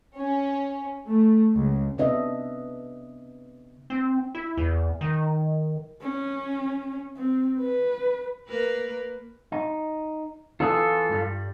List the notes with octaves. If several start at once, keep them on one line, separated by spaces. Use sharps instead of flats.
C#4
A3
C#2
C3 B3 D4 B4 D#5 E5
C4
E4
E2
D#3
C#4
C4
B4
A#3 A#4 B4
D#4
E3 F4 G#4 A4
G2 G3